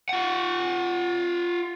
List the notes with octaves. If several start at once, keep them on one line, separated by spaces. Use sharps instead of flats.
F4 F#5